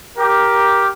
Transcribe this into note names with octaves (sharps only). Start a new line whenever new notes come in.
G4 A#4